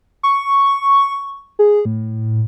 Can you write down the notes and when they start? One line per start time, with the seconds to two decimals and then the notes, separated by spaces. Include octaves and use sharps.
0.23 C#6
1.59 G#4
1.85 A2